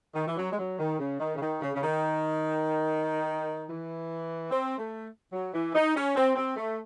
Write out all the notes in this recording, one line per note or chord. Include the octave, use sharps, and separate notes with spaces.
D#3
E3
F#3
G#3
F#3
D#3
C#3
D#3
C#3
D#3
C#3
C#3
D#3
E3
C4
A3
F#3
E3
D#4
C#4
C4
C4
A3